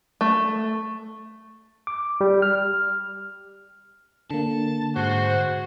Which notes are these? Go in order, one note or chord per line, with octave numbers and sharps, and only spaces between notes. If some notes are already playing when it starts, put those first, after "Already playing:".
A3
D6
G3
F6
D3 A#3 A5
G#2 F#4 C5